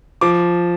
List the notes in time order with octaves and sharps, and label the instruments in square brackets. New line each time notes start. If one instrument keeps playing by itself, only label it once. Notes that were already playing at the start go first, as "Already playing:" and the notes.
[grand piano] F3 D6